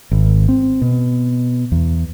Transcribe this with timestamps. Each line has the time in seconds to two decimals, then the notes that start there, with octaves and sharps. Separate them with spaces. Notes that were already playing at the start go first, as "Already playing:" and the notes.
0.11 G#1
0.49 C4
0.82 B2
1.72 E2